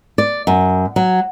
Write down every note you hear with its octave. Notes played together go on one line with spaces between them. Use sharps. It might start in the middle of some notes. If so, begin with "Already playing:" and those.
D5
F#2
F#3